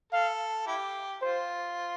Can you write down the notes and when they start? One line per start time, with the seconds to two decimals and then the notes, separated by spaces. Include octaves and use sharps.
0.13 A4 F5
0.67 E4 G4
1.22 F4 C5